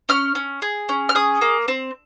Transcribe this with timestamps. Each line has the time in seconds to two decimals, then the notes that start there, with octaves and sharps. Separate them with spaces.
0.09 C#4 F6
0.35 C#4
0.62 G#4
0.89 C#4
1.09 F6
1.15 G#4 D#6
1.41 A#3
1.68 C4